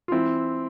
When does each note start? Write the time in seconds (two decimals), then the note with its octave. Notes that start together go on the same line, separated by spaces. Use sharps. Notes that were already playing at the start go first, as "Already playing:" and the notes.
0.08 F4
0.12 E3 C4 E4